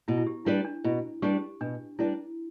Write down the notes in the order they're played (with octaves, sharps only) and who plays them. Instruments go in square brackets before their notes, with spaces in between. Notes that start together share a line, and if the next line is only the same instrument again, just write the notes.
[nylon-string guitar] B2 [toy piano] E4
[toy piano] E4
G4
[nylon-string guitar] G3 D4 B4 D5 [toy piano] E4
[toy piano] D4
[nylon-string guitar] B2 [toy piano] E4
[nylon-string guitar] G3 D4 B4 D5 [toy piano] G4
[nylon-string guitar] B2 [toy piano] D4
[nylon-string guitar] G3 D4 B4 D5 [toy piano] E4